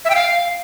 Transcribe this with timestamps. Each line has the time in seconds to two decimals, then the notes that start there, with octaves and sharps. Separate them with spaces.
0.05 E5
0.10 G5
0.15 F5